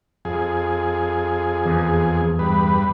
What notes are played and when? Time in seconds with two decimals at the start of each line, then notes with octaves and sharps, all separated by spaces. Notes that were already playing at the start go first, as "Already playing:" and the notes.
0.25 F2 G#4
1.66 E2
2.39 G2 B4